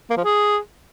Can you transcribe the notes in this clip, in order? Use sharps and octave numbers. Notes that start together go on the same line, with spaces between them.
A#3
F3
G#4